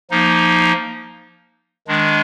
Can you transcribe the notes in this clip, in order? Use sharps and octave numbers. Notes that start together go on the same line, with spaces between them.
F3 A#3 D#4
D#3 G#3 D4